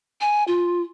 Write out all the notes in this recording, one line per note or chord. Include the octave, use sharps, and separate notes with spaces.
G#5
F4